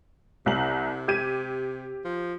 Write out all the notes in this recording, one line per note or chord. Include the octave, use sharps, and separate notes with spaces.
C2 C3 F#7
G4 G#6 D#7
F3